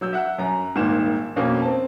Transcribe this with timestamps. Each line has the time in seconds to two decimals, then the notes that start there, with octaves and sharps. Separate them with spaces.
0.01 F#3 E6 G6
0.13 E5 F#5 F#6
0.38 F#2 A#5
0.75 D#1 G#1 D#3 A#3 E7
1.36 F2 B2 A#3 C#4
1.62 C4 A5